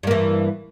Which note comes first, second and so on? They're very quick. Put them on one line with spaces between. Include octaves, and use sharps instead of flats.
G2 A#3 E3